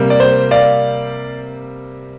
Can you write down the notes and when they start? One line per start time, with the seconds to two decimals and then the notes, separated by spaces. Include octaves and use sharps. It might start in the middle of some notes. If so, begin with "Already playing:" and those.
Already playing: C3 G3 A#3
0.10 D5
0.20 C5
0.51 D5 F5